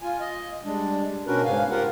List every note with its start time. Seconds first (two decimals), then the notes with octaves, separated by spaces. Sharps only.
0.01 F4 G#5
0.20 D#5
0.65 G3 G#3 D4
1.27 B2 C#4 D4 F#4 A#4 B4
1.45 G#2 C#3 F5 G#5
1.70 F4 G4 A#4 F#5